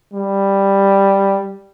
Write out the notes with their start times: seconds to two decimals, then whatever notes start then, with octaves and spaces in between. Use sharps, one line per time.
0.14 G3